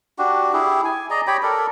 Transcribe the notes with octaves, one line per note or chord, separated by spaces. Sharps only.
D4 F#4 G4
E4 G4 G#4
G#5
G#4 D5 D#5 A#5
G4 C#5 G5 B5
A4 A#4 D5